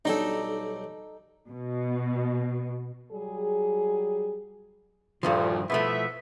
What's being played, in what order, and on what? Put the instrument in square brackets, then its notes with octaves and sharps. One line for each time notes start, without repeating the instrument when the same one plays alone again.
[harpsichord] B1 G3 G4 [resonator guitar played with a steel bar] D#4 A4
[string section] B2
[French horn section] F#3 G3 G#4
[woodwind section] D2 A#2 [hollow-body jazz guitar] G2 D#3 F3
[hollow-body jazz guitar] B2 F3 A3 [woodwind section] B3 E4 E5